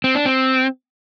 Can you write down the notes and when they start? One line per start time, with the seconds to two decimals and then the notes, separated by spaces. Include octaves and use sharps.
0.04 C4
0.15 D4
0.26 C4